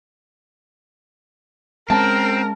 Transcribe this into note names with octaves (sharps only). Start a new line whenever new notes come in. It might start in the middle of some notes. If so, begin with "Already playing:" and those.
G#3 A3 C4 C#4 A#4 A5